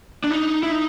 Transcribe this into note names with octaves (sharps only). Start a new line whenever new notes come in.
D4
D#4
E4
D#4